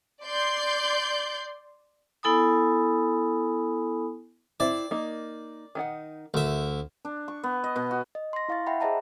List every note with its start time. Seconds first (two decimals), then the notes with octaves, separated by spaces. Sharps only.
0.23 D5 C6 G6
2.23 B3 E4 A4 G#5 B5 D#6
4.60 C4 E4 D5
4.91 A#3 D#4
5.75 D#3 D#4 F#5
6.34 D2 A#4 E5
7.05 D4
7.28 C#6
7.43 B3
7.64 D#5
7.76 B2
7.91 F#4
8.15 D#5
8.33 C6 A#6
8.49 E4 F5 C#6 A6
8.67 E5 F#5 G5 B5
8.80 G#4 C5 D#5 E5 A5 A#5